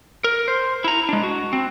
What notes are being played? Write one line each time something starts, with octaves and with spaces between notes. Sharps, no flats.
A#4
C5
E4 A#5
G#3 D4
F#4
C4